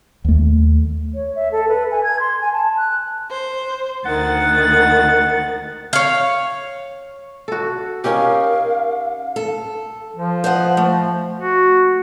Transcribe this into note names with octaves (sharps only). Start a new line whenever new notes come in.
D#2 A3
C#5
E5
A4
B4
G#5
G#6
C6
G#5
A5
F#6
C5
D2 D#3 F#5 A6
C#5 F5
F#4 A4
C#4 D#4 G4 A#4 F5
A4
F3
C5 D#5 F#5
A3
F#4